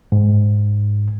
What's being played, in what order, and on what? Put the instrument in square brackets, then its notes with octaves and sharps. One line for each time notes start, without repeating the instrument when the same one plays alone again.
[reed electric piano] G#2